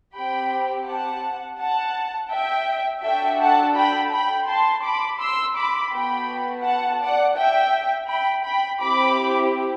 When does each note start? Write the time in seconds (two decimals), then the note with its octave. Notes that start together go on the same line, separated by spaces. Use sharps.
0.15 C4 G4 G5 B5
0.87 F#5 A5
1.60 F#5 A5
2.31 E5 G5
3.03 D4 F#4 A4 E5 G5
3.41 F#5 A5
3.76 G5 B5
4.12 G5 B5
4.48 A5 C6
4.84 B5 D6
5.20 C6 E6
5.56 B5 D6
5.92 B3 F#4 A4 G5 B5
6.65 F#5 A5
7.00 D5 F#5
7.36 E5 G5
8.08 G5 B5
8.45 G5 B5
8.80 C4 E4 G4 B5 D6